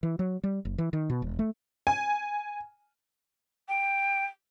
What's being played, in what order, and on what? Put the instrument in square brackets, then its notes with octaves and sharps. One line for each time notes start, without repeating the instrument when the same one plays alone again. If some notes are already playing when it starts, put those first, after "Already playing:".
[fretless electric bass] E3
F#3
G3
F#1
E3
D#3
B2
E1
A3
[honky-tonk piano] G#5
[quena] G5